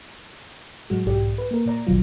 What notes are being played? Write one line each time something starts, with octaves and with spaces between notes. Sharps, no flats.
A2 F#3 G#3 F#4
B1 G#2 G4 D5
B4
A#3 A#4
A#2 D5 A#5
A1 D#2 B2 F3 F#3 F4